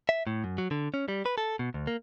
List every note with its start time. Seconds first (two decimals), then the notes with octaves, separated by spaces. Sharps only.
0.09 E5
0.27 A2
0.44 F#2
0.58 F#3
0.71 D3
0.94 C#4
1.08 G3
1.26 B4
1.38 A4
1.59 B2
1.74 D2
1.87 A#3